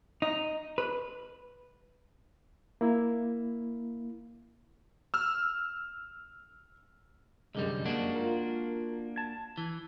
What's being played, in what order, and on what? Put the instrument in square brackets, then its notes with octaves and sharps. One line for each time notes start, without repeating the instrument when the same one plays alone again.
[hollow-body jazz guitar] D#4
B4
[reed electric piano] A#3 E4
[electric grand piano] E6 F6
[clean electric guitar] C2 D3 G3 [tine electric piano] F#2 G#3
[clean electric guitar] A#3 D4 F#4
[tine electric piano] F4 A#4
A5 G#6
[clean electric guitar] E3